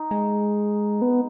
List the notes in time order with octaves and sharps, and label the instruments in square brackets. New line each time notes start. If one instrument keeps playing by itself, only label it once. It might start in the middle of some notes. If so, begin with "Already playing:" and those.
Already playing: [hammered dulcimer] D#4
[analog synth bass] G#3
B3